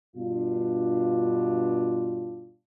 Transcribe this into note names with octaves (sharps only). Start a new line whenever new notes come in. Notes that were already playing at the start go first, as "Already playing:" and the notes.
G2 B2 D4 F4